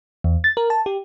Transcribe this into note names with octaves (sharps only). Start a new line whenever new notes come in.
E2
A6
A#4
A5
G4